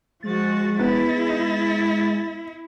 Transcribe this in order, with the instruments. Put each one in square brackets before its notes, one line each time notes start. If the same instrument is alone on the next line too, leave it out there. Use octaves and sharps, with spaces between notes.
[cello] F3 F#4 [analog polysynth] G#3 A6
[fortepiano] B3 [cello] E4